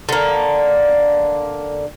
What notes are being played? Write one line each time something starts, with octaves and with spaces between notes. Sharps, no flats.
D3 A#3